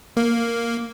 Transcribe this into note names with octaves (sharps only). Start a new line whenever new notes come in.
A#3